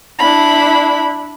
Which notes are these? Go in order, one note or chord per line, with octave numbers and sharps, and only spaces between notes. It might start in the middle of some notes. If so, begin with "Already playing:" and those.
D4 E4 B5